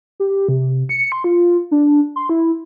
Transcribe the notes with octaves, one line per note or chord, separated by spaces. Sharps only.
G4
C3
C#7
C6
F4
D4
C6
E4